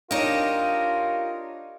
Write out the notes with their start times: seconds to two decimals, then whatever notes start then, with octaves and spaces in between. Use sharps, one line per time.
0.11 D4 D#4 F4 G4 A#4 C#5 D#5